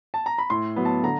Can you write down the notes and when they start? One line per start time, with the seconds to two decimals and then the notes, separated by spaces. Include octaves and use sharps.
0.14 A5
0.26 A#5
0.38 B5
0.50 A2 C6
0.76 F#3 B3
0.85 A5
1.03 D3 A#5